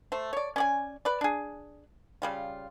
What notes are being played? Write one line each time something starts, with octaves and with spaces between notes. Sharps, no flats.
A3 C5
C#5 D5
C#4 D5 G#5
B4 D5
D4 G#4
C#3 G3 F4